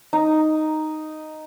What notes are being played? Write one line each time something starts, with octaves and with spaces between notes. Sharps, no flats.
D#4